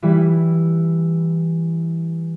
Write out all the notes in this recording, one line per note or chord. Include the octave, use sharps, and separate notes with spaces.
E3 G3 E4